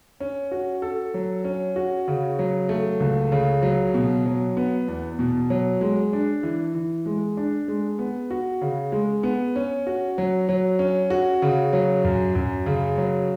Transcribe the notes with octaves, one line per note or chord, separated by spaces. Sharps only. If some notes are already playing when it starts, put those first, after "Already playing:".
C#4
F#4
A4
F#3
C#4
F#4
C#3
F#3
A3
C#2
C#3
F#3
B2
F#3
B3
E2
B2
F#3
G#3
D4
E3
E3
G#3
D4
G#3
B3
F#4
C#3
G#3
B3
C#4
F#4
F#3
F#3
C#4
F#4
C#3
F#3
F#2
F#2
C#3
F#3